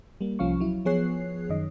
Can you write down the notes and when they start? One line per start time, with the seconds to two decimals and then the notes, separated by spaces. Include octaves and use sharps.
0.21 G3 A#3
0.39 C2 F3 C#4 F5 C#6
0.60 F#3 E4
0.85 F3 B3 G#4 C#5 F#6 C7
1.49 F#2 D#3 D#5